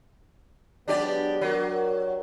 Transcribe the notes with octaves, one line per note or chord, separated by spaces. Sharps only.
F#3 G#3 B3 D4 G4 D5
F#3 F#4 G4 A#4